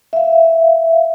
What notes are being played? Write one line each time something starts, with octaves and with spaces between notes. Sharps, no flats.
E5 F5